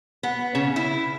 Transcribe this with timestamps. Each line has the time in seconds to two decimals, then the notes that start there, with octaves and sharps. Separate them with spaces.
0.23 B3
0.55 C#3
0.76 E4